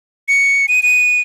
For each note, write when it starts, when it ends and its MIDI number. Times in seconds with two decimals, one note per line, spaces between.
0.29 0.66 97
0.68 0.82 99
0.83 1.21 99